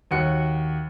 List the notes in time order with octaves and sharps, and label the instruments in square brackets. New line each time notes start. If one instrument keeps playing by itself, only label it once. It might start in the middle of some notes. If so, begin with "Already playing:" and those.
[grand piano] D#2 F#4 C#7